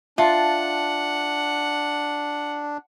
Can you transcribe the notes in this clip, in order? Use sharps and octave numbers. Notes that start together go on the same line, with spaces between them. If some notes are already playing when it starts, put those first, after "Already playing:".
D4 F4 E5 F#5 A5